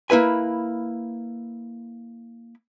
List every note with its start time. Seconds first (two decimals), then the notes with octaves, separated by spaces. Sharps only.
0.10 A#3 E4 B4 G#5